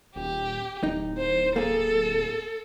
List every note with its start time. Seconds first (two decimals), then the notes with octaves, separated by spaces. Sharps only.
0.16 D#1 G4
0.83 D1 D#4
1.18 C5
1.56 A#3 G#4 A4